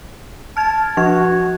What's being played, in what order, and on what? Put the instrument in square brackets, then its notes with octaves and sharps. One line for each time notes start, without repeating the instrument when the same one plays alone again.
[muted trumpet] A5 [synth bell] F6 G#6
[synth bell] F3 D4 G#6 [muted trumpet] F#4